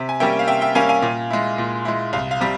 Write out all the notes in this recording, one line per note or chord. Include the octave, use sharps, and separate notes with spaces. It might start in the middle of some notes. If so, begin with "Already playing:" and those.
Already playing: C3
G#5
G3 A#3 C#4 E5 G5
F5
C3 E5 G5
E5 G5
G3 A#3 C#4 F5 G#5
F5 G#5
A#2
G#3 E4
A#2
G#3 E4
C2 F5
F5
C3 G3